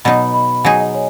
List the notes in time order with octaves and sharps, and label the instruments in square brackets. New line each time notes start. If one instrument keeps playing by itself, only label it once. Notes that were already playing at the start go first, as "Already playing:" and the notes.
[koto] B2 F#3 D#4 [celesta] B5
[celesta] B5
[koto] F#3 D#4 G#4 [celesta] G#5
[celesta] D#5
C#5